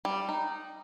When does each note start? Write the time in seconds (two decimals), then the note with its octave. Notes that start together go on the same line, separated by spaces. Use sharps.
0.05 G3
0.29 D#4